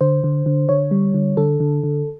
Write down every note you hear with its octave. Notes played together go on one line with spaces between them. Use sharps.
D3 C5
D3
D3
D3 C#5
G3
D3
D3 A4
D3
D3